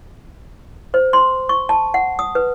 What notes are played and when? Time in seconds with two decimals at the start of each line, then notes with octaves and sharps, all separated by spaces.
0.94 C5
1.13 C6
1.49 C#6
1.69 A5
1.94 F#5
2.19 D#6
2.35 B4